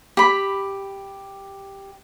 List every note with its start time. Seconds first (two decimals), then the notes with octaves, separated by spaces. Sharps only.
0.17 G4 B5